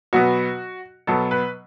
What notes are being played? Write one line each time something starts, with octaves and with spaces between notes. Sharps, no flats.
B2 F#3 B3 F#4
B2 F#3 B3 A4
B4